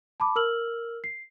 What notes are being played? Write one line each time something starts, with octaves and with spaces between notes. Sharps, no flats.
A5 B5 D6
A#4 E6 F6 F#7
C7